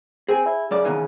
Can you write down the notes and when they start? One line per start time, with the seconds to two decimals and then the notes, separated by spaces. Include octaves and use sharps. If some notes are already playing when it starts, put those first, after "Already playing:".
0.28 C4 G#4 G#5
0.46 E4
0.71 F#2 C#3 D5
0.85 B2 D#3 E3